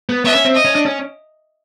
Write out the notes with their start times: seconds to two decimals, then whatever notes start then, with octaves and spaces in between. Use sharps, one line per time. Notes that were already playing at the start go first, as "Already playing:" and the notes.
0.09 B3
0.25 B3 E5
0.35 C#4
0.45 C4
0.55 D#5
0.65 C#4
0.75 D4
0.86 C#4